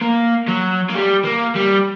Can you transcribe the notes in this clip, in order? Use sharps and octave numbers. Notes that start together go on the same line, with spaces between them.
A#3
F#3
A#3
G3
A#3
G3